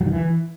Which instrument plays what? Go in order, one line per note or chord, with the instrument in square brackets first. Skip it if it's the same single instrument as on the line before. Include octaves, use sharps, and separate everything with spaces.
[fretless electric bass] F#3
D#3
E3